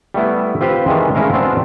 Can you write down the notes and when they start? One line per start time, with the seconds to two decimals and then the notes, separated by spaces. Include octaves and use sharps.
0.14 G3 A3 B3 E4
0.61 C4 F4 G4 B4 C5
0.86 D#3 E3 G#3 D4
1.15 G#3 A3 C#4 E4 A#4 F5
1.33 B3 C4 D4 F#4